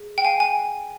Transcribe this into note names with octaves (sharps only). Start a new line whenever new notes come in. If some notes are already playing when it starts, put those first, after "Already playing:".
Already playing: G#4
G5
F5 G#5
G#5